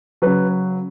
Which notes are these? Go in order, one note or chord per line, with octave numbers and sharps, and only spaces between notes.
C#3 F#3 B4